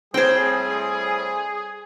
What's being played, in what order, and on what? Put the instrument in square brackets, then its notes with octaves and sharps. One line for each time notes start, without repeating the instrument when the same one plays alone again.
[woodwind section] A2 G3 [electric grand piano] C4 G#6 [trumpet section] G#4 [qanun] C5 G5